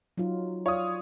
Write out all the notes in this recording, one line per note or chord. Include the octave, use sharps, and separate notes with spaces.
F#3 D#4 F4
F4 C#5 D5 F5 D#6